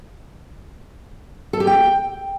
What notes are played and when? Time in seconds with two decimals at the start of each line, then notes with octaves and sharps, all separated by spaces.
1.53 A4
1.60 G4
1.67 G5